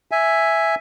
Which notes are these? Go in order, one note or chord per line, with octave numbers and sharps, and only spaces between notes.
E5 G#5